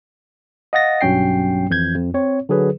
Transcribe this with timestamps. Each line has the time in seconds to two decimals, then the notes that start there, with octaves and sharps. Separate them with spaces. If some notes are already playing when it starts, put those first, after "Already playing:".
0.73 D#5 F5 F#5 D#6 A6 A#6
1.01 B1 G2 F#3 C#4 G5 C7
1.70 G#1 F2 E3 G6 G#6
1.95 F2
2.14 C4 C#5
2.49 D3 F#3 G#4 B4